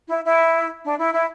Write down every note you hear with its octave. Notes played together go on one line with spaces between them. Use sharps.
E4
E4
D4
E4
E4